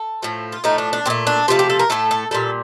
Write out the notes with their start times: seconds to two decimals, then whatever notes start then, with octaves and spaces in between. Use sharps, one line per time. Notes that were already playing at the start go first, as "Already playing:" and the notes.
Already playing: A4
0.22 A2 F3 A3
0.52 F4
0.64 A2 F3 A3 D#4
0.78 D4
0.93 D4
1.06 A#2 A3 C4
1.27 D4
1.48 C3 F3 A3 F4
1.59 G4
1.70 A4
1.79 A#4
1.90 A2 A3 A4
2.11 A4
2.31 A#2 G3 A4